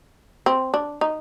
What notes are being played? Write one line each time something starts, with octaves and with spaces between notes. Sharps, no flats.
C4
D4
D#4